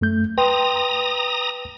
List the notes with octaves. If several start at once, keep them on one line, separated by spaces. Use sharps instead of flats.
F#2 A3 G6
B4 G5 A#5 C6 D#6